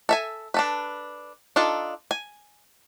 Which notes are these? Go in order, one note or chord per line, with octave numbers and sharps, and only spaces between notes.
A4 E5 G#5
D4 A4 B4
D4 D#4 F4 A4
G#5